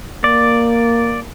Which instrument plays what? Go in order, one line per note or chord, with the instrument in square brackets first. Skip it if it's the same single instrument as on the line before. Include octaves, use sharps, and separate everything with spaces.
[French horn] A#3 [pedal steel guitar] D5